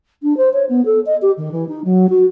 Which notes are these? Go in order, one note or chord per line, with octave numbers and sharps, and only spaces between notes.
D4
C5
C#5
B3
A4
D#5
G4
D#3
E3
D#4
F#3
F#4